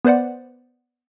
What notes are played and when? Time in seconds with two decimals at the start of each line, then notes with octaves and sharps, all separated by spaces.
0.05 B3 B4 C5 D5 F#5